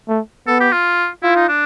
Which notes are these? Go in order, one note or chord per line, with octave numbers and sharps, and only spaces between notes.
A3
B3 A4
G4
F4
E4 F4
D#4
D4